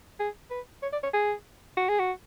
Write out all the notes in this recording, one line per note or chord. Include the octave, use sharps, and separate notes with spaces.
G#4
B4
C#5
D5
C#5
G#4
F#4
G#4
F#4